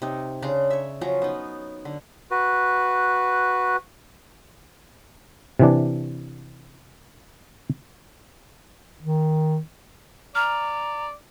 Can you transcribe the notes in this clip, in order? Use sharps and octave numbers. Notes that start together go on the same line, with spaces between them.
C3 D#4
C#3 D4 A#5 C6
C#5 E5
F3 F#3 C#4 A#5
B3 D#4
D3
F#4 B4
C3 E3 D4
D#3
D5 A#5 F6